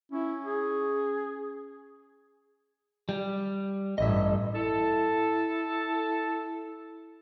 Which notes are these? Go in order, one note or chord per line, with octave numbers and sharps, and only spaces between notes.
C#4 E4
G#4
G3
A1 G2 D#5 E5
E4 A4